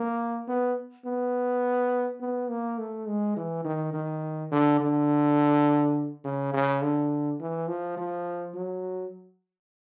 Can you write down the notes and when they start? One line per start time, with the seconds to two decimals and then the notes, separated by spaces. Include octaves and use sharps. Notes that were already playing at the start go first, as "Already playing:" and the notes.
Already playing: A#3
0.48 B3
1.05 B3
2.21 B3
2.50 A#3
2.78 A3
3.07 G#3
3.37 E3
3.65 D#3
3.93 D#3
4.51 D3
4.80 D3
6.24 C#3
6.53 C#3
6.82 D3
7.40 E3
7.68 F3
7.97 F3
8.55 F#3